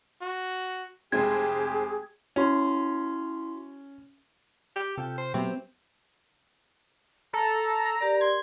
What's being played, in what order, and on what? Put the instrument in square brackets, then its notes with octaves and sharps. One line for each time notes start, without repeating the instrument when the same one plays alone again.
[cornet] F#4
[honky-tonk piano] F1 G#3 C4 [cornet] G4 [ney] G#4 [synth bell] G#6
[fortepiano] C#4 [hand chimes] E4 F#4 C6
[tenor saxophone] G4
[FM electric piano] C3 F4 G5 [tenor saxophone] A4
[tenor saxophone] C5
[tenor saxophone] C3 [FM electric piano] F#3 B3 [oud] C4
[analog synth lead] A4 [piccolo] A#5
[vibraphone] G4 A#4 D5
[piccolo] C6 [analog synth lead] G#6